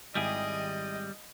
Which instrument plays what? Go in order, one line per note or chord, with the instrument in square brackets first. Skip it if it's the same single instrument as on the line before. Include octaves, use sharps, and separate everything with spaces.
[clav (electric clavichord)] G#1 E4 G#5 [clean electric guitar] G3 G4 G#4 [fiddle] D#5